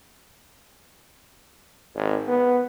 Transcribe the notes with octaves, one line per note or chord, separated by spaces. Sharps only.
G#1
B3